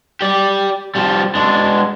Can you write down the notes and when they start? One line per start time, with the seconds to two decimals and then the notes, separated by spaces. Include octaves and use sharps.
0.21 G4 D5
0.95 F3 G3
1.35 G#3 D4